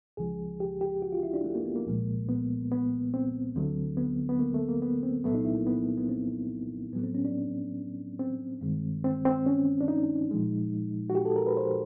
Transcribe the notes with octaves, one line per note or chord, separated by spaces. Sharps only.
C#2 C#3 F3 G#3 G#4
G4
G4
F#4
F4
E4
D4
A3
A#3
B3
A#3
C2 A#2 F3 G#3
B3
B3
C4
D2 D3 F#3 A3
B3
B3
A#3
A3
A#3
B3
C4
C2 A#2 F#3 A3 B3
D#4
E4
A#3
B3
B3
C4
A2 F#3 A3 B3
C4
C#4
D4
C4
G2 D#3 G#3
C4
C4
C#4
D4
D#4
A#2 F3 G#3
F#4
G4
A4
A#4
B4
C5